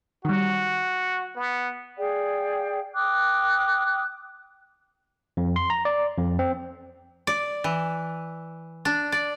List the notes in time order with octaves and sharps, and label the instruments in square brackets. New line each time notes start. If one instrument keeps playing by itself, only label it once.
[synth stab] D#3 G3 [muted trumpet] F#4
[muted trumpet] B3
[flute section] G#4 D5 F5 G5
G5 D6 D#6 F#6
[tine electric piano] F2
C6
A#5
D5
F2
C4
[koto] D5
E3
D4
D5